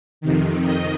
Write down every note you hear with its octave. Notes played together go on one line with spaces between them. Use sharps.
F2 C3 D#3
F2 D#3 D#5